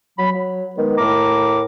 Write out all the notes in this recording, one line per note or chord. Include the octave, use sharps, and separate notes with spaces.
F#3 B5
F#3
D#3 G#3 B3 B4
A2 A#4 A#5 D6